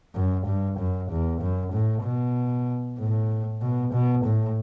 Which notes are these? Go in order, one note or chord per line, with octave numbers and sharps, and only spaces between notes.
F#2
G2
F#2
E2
F#2
A2
B2
A2
B2
B2
A2